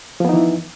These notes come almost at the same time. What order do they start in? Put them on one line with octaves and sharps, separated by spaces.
F3 B3 D#4 E3